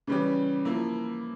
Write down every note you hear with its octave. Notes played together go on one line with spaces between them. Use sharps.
C#3 E3 G3 C#4 G4
F3 A#3 E4